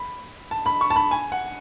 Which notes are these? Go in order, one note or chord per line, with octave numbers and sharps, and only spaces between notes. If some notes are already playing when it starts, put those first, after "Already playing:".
Already playing: B5
A5
B5
C#6
A5
B5
G#5
F#5